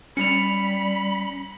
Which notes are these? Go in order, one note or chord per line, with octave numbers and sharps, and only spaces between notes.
G3 C#4 B5 C#7 F7